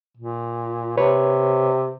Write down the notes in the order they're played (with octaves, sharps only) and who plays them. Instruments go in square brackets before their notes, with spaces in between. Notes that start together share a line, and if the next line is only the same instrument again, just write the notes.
[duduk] A#2
[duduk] C3 [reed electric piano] B4 C#5